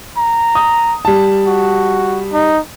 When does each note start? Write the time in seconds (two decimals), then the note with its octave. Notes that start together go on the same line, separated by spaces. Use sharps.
0.17 A#5
0.55 D#6
1.05 G3 A5
1.47 F#4
2.33 D#4